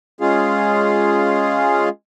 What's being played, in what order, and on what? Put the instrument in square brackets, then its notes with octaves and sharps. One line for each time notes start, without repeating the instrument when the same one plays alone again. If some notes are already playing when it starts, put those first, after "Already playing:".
[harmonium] G#3 C#4 F4 G#4 F5